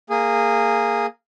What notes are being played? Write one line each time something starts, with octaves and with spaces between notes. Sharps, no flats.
A#3 G#4